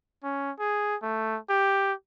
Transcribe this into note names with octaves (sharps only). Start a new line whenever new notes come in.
C#4
G#4
A3
G4